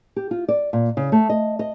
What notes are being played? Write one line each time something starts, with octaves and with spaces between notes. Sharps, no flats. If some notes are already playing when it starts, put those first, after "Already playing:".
G4
F4
D5
A#2
C#3
A3
D#5
D#5